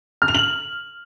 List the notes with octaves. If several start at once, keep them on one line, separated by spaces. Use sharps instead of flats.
F6
F7
F#7